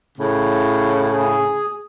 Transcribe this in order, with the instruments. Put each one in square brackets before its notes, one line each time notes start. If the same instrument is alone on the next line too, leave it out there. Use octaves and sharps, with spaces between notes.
[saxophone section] A2 C#3
[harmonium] G#4